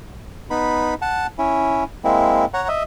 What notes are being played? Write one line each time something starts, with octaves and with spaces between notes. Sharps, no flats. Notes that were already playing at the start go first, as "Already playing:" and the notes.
B3 D#4 B5
F#5 A5
C#4 E4
G#3 A#3 C4 E4
C#5 F#5 A#5
D#5 E5